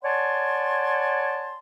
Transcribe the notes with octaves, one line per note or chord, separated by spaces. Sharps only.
C#5 D5 F#5 G#5 A5 C6